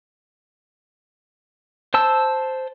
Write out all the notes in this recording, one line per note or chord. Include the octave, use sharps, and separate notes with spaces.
C5 A5 E6